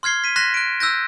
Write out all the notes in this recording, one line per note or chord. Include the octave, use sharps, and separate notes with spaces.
C6 F6 G#6 C7 G7
B6 D#7
C6 F#6 A#6 B6 E7
F#6 D7
E6 F#6 G6 A#6